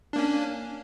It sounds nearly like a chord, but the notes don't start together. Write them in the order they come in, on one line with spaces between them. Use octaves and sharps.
D4 A#3 C#4